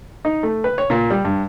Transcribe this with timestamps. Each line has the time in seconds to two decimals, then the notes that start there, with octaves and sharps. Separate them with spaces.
0.25 D#4
0.43 A3
0.64 B4
0.78 C#5
0.90 A#2
1.10 G3
1.25 G2